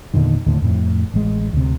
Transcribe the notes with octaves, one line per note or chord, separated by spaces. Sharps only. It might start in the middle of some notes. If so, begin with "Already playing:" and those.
E2 A#2 D3 D#3
D#2 A2 D3
F2 A2
A1 G#3
D2 C3